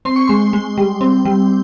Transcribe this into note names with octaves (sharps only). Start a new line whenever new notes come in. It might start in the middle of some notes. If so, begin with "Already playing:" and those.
C4 C6
C#6
G#3 C6
G#3
G3
C4
G3